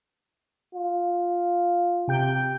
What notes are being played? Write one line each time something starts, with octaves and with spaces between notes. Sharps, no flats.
F4
C3 G5 G6